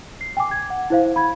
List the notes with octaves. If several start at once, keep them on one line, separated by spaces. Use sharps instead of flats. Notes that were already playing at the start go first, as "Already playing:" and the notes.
C7
G5 G#5 D6
G#6
F#5
E4 C5 F5
B5 G#6